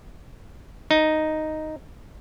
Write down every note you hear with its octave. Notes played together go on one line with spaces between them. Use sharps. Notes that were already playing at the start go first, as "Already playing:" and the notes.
D#4